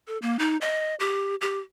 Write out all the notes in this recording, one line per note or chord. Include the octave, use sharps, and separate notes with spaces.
A4
A#3
D#4
D#5
G4
G4